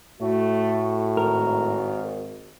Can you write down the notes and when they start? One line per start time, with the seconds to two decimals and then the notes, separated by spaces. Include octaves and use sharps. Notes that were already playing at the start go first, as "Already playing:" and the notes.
0.21 A2 A3 F#4
1.17 G#1 A#4